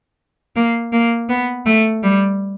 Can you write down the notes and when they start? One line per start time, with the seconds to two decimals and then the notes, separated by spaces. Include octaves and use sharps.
0.56 A#3
0.92 A#3
1.29 B3
1.65 A3
2.03 G3